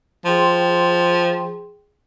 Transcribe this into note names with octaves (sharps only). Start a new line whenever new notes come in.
F3 G#4 G5 C6